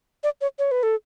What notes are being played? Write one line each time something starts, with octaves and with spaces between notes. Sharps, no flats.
D5
C#5
C#5
B4
A4